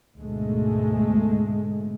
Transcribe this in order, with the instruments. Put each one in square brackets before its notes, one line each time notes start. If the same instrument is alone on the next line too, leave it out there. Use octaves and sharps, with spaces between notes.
[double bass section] D2 G#2 B2 G#3 A3